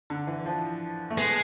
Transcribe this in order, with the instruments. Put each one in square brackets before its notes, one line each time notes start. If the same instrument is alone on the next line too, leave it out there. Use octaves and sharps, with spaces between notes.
[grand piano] D3
E3
F3
A3
[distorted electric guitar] G#3 [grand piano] B3